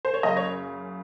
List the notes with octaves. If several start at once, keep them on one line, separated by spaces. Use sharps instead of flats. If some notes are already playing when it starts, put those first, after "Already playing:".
C5
C#5
F#1 F#2 C#3 D#5
C#5